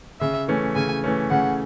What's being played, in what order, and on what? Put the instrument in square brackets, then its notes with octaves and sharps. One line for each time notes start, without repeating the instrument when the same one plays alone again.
[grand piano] C#3 [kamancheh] E5
[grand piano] E3 A3 C#4
[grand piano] C#3 [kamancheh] G#5
[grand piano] E3 A3 C#4
[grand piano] C#3 [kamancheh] F#5